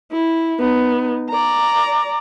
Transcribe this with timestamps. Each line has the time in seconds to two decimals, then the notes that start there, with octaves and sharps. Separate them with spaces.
0.12 E4
0.60 B3 D#4
1.30 D5 A#5